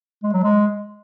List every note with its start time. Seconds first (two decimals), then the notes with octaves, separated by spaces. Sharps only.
0.23 G#3
0.33 F#3
0.43 G#3